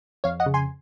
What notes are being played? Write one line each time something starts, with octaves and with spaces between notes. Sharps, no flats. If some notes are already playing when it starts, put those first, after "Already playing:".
F2 C#5 F5
D#5 F#5
C#3
G#5 C6